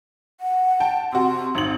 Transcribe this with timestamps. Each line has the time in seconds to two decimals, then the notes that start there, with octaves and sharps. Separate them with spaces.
0.41 F#5
0.80 G5 A5
1.12 C3 F#4 C6
1.55 G#1 D#4 F#7